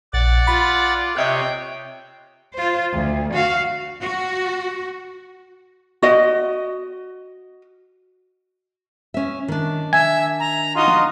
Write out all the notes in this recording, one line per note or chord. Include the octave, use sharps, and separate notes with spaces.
A#1 D5 F#5 A6
F4 B5
C3 C#5 D#5 E5 G5 F#6
F4 C5
D2
F#4 F5
F#4
F#4 D#5
C#4 E5
D#3 D4
E5 G#5
A#5
D#4 F4 F#4 D#5